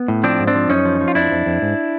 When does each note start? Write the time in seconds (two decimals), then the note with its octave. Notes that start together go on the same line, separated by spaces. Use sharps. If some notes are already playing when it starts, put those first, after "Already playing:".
Already playing: B3
0.08 A2
0.23 F3 C4 D4
0.40 G#2
0.47 C4 D4
0.55 F3
0.69 F#2 C#4 D#4
0.85 F3
1.01 F3
1.08 F4
1.15 F2 D4 E4
1.31 F2
1.46 F2
1.62 G#2